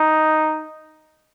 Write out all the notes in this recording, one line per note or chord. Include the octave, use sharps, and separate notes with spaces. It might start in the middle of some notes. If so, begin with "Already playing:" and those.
Already playing: D#4